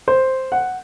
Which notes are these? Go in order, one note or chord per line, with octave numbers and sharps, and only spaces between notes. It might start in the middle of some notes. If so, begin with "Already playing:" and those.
C5
F#5